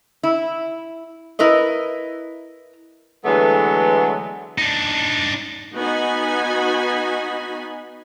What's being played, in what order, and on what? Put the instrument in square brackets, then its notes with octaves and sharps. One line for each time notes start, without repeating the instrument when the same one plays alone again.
[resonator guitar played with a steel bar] E4
E4 A#4 B4 D#5
[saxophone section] D3 E3 F#3 G#3 A3 B3
[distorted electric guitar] D4 D#4
[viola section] B3 D#4 F#4 G#5 B5